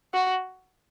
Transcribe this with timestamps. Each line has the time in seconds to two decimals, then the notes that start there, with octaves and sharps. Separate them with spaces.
0.14 F#4